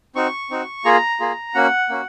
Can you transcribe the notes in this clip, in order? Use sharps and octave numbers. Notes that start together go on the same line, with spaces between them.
C4 D#4 F#4 C#6
C4 D#4 F#4
A#3 F4 G#4 A#5
A#3 F4 G#4
A#3 C#4 F#4 F#5
A#3 C#4 F#4